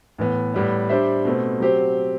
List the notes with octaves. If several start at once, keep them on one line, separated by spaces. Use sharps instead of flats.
A2 E3 B3
A2 G3 B3
G3 D4 G4 C5 E5
B2 A3 C4
F#3 C4 G4 C5